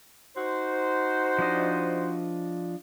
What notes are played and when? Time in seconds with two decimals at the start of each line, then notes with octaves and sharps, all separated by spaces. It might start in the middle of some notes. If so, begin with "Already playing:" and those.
0.36 D#4 F#4 C5
1.39 F3 D4 D#5